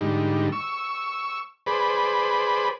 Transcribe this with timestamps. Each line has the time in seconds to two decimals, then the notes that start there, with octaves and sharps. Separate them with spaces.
0.01 G#2 D3 G3 D#4
0.52 C#6 E6
1.66 G#4 B4 C5 D5 B5